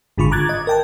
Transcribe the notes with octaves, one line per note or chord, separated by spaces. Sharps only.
G#1 G#2 D3 F4 B5 C#6
A#5 D6 F#6 G#6 A6
D#5
A#4 G5 A5